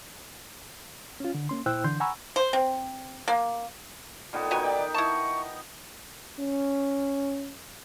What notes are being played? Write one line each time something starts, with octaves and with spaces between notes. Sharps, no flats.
C#4 F4
D3
A#3 C#4 C6
A#2 E4 C5 G5 E6 F#6
D3 E3 D4 C6 G6
F#5 G#5 A#5 B5 C#6 E6
C5
C4
A#3
A#2 D#3 B3
B3 D#4 F#4 B4 G5 G#5
D5 G5
E4 A5 C#6
C#4